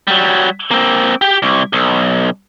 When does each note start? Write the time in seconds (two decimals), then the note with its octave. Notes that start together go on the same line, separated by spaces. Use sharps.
0.08 F#3 G3
0.71 A#3 C4
1.22 G4 G5
1.42 C2
1.73 B1